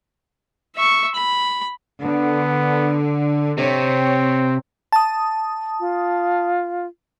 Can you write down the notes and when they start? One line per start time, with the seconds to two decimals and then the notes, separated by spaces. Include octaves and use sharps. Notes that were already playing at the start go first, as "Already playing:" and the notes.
0.76 E5 C#6
1.15 B5
2.02 D3 B3
3.58 C3 C4 C#5
4.92 A5 D#6
5.80 F4